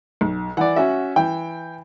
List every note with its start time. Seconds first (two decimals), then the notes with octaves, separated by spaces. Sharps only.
0.21 B1
0.57 E3 D5 F#5
0.76 C#4 F#4 E5
1.16 E3 G5